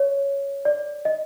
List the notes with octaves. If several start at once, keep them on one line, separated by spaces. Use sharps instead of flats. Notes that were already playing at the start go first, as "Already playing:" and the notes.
Already playing: C#5
D5
D#5